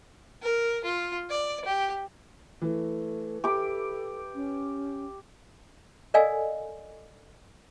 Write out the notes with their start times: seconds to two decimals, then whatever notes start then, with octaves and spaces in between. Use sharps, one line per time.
0.43 A#4
0.84 F4
1.30 D5
1.65 G4
2.62 E3 A3
3.44 G4 A4 B5 D6
4.35 C#4
6.14 A4 A#4 D5 D#5 F5 G#5